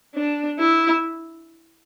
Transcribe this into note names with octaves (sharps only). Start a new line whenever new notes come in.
D4
E4